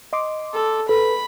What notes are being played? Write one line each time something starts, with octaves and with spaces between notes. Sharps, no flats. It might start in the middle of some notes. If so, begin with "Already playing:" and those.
D#5 C6 D6
A4
A4 B4 B5